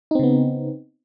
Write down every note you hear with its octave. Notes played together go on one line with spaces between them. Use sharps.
C#3 B3 C4 D#4